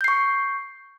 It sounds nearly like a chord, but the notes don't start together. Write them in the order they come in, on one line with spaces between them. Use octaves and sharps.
G6 C7 C#6